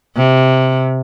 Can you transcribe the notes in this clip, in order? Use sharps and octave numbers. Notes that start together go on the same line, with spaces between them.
C3